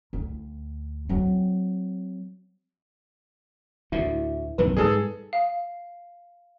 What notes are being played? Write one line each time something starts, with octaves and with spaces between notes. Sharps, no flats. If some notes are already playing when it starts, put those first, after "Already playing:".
D2
F#3 C4
D2 A2 E4
B1 F#2 D#3 B4
G#2 G3 G#4 A4
F5